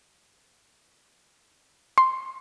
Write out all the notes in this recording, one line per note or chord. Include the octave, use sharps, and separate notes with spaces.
C6